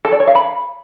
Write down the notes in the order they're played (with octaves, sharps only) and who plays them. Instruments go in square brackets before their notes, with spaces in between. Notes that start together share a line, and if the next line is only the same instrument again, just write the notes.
[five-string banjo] A4
D5
C#5
F5
B5